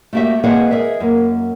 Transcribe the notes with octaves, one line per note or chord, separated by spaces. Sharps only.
A3 A#3 F#4 G4 E5
G#3 A#3 C4 G#4 B4 F#5
G#4 A#4 D#5 E5
F#2 A#3